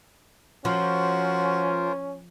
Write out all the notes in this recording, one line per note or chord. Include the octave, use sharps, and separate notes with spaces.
F3 C#4 F4 F#4 A#4 C5